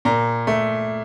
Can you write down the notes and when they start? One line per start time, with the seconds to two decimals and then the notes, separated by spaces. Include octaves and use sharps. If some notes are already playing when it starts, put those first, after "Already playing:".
0.05 A#2 A#5
0.47 A3